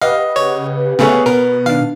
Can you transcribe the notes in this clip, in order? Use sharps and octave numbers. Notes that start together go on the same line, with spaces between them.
G4 B4 D#5 F5 F#5
C#3 C#5
C#3 A3 B3 G#4 C#5
B2 B3 A#4
D#3 D4 F5